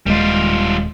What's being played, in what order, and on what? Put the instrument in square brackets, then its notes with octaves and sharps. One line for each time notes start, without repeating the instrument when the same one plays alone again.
[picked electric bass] D#1 G#3 [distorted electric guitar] G3 F4